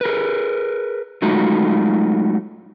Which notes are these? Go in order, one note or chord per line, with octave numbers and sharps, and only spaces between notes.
G#4 A#4 B4
F#3 G#3 A3 D#4 F4 F#4